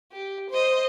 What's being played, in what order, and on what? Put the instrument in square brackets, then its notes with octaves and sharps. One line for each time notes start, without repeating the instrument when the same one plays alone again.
[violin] G4
C5 D#5